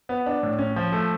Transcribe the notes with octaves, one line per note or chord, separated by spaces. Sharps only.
B3
D4
A2
C#4
F3
A3